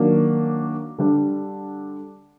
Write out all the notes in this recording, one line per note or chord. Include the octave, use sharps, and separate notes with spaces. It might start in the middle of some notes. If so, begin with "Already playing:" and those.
Already playing: D#3 F#3 A#3 D4
D3 G3 D4